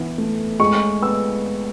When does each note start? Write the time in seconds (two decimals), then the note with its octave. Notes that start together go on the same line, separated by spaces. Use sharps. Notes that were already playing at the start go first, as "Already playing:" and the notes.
Already playing: E3 B3
0.18 A3
0.60 G#3 C#6
1.02 B3 E6